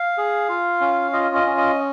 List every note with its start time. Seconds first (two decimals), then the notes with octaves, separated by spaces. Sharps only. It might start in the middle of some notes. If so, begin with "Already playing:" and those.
Already playing: F5
0.18 G#4
0.49 F4
0.81 C#4
1.13 F4 D#5
1.35 D#5
1.46 C#4
1.57 D#5